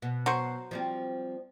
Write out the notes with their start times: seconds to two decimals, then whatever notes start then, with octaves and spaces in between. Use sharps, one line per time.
0.02 B2
0.26 F#3 C5 C#6
0.71 F3 G3 C4